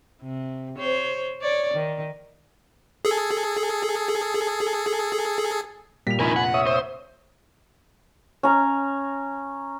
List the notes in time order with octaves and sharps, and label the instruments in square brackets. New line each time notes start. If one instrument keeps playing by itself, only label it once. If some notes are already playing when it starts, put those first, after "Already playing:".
[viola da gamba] C3
C5 C#5
C#5 D5
D#3
[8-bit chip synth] G#4 A4
[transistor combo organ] A#2 G3 [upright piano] B6 F7
[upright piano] F1 A#1 [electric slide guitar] D#4 E4 A#4 [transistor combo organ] G#5 B5
[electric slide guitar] F#5
[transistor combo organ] C#5 E5 D#6
[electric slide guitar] C5
[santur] C#4 A#5